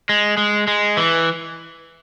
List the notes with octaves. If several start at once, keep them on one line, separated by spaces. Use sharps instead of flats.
G#3
G#3
G#3
E3